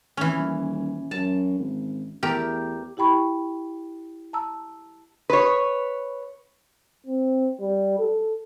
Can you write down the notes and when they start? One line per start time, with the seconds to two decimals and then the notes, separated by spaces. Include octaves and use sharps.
0.17 F1 E3 C#4
0.37 D#1
1.11 F#2 A5
1.58 G#1
2.23 E2 A3 G4 A#4
2.97 E4 G4 G5 B5 C#6
4.33 A5 A#5 E6
5.30 B4 C#5
7.06 C4
7.61 G3
7.99 A4